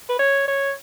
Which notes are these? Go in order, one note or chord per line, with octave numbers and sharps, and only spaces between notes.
B4
C#5
C#5